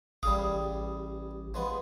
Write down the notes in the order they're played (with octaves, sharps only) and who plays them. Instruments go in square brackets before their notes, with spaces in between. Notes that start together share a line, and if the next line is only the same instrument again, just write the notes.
[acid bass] A1 [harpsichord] G3 G#4 F5 [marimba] D#6
[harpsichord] F3 G#3 B3